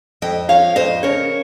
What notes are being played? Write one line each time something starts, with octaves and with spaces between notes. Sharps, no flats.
F2 D#5 G5
F3 C#5 F5
F2 C5 D#5
C#3 A#4 C#5